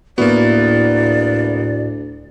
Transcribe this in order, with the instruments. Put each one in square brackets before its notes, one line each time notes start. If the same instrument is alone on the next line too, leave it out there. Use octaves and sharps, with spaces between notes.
[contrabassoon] D2 [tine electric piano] A2 E4 F#4 [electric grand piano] A#3 B3 [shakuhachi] D5